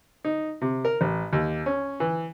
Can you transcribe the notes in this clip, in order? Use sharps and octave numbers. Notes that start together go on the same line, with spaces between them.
D#4
C3
A#4
A1
D#2
C#4
E3